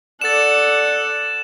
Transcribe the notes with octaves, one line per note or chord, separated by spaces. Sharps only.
A4 D5 F#5 A6 E7